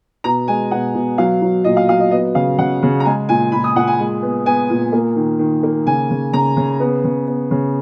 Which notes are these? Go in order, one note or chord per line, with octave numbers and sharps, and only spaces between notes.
B2 A#5
G#3 G#5
B2 F#5
B2
F#3 F5
F#3
A#2 D#5
F5
F#3 F5
D#5
B3 D#5
C#3 F5
C#3 F#5
C#3
A#5
G#3 G#5
A#2 G#5
A#2 B5
D#6
A#2 F#5
G#5
G#3
B3
B3 G#5
A#2
A#3
D#3
D#3
A#3
C#3 G#5
C#3
C#3 A#5
C#3
B3
C#3
B3
C#3